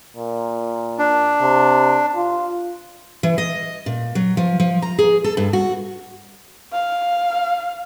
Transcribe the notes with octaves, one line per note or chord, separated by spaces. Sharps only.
A#2
D4
C3
F4
E3
D#5
A#2
F#3
F3
F3
A#5
G#4
A4
G2
F#4
F5